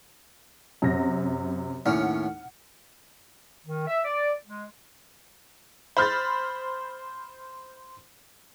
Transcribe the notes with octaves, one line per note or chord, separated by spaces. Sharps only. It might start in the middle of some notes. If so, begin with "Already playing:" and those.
F#2 C3 A#6
D#2 A2 C#4 F#5 F6 C#7
D#3
E5
D5
G#3
C5 B5 F6 G6 A6